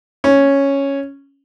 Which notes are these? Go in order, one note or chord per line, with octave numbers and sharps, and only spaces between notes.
C#4